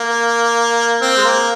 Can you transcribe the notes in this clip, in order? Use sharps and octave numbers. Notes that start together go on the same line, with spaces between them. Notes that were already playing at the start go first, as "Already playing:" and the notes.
Already playing: A#3
C4
G#3
A#3